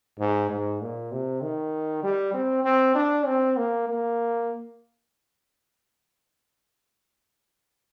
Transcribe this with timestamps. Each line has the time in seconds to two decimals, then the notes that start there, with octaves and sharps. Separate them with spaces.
0.19 G#2
0.50 G#2
0.81 A#2
1.12 C3
1.42 D#3
2.03 G3
2.34 C4
2.65 C4
2.95 D4
3.26 C4
3.57 A#3
3.88 A#3